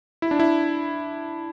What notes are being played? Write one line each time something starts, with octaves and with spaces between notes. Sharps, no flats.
E4
D4
E4